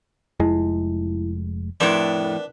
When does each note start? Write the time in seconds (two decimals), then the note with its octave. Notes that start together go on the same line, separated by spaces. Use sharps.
0.40 F1 F2 G#3 E4
1.80 F2 A2 D4 A#4 B4